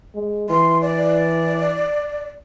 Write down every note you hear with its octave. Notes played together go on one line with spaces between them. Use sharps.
G#3
E3 C6
D5